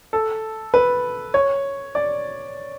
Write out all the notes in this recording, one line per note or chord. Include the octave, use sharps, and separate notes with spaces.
A4
B4
C#5
D5